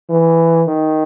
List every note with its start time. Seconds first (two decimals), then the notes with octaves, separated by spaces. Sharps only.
0.10 E3
0.67 D#3